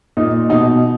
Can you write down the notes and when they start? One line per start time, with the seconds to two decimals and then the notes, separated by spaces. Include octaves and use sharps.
0.17 A#2 D#4
0.49 B2 D#4